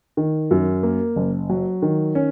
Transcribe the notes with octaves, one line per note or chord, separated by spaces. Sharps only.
D#3
F#2
A#3
F#1
F#3
D#3
C#4